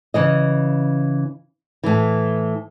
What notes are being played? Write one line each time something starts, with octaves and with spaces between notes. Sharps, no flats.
C#3 E3 D#5
A2 E3